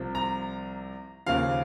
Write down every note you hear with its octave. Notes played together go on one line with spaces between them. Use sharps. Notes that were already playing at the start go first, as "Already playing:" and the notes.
Already playing: C2 C3 F3
A#5
D#2 C#3 F3 F5